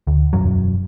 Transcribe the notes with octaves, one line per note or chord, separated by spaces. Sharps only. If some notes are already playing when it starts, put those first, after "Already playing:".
D2
E1 F#2 F#3